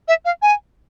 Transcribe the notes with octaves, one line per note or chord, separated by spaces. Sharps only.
E5
F5
G#5